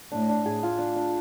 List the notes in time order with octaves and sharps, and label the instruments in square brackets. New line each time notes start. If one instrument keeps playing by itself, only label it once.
[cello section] A2 [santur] D4
[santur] D4
G#4
F4
D4
D4